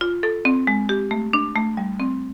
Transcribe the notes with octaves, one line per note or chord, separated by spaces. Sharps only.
F4
A4
C4
G#3
G4
A3
D4
A3
G3
C4